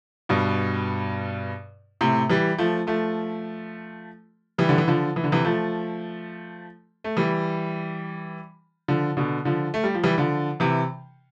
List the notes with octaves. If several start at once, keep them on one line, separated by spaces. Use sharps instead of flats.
G2 B2
A2 C3
E3 G3
F3 A3
F3 A3
E3 G3
D3
E3
D3 F3
E3
D3
C3 E3
F3 A3
A3
E3 G3
D3 F3
B2 D3
D3 F3
A3
G3
F3
E3 G3
D3 F3
C3 E3